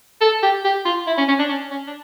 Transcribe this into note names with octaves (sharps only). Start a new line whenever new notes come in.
A4
G4
G4
F4
E4
C#4
C#4
D4
C#4
C#4
D4